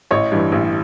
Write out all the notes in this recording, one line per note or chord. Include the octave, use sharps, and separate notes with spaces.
A1 C#5 D#5
G2 E3
A1